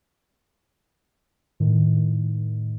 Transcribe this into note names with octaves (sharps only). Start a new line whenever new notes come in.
A2 D#3